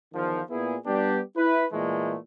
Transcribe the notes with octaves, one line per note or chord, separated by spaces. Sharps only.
E2 D#3 F3
A#2 B3 E4 G#4
G3 B3 D4 G4
E4 B4
A#2 E3 G#3 A3